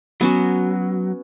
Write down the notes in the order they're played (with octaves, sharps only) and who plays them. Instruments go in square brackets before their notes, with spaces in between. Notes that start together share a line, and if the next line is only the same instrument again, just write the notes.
[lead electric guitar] F#3 [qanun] B3 C#4 F#4